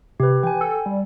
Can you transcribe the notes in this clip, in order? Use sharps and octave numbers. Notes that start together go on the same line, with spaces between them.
C3 G4 B4
E3 G5 G#5
A4
G3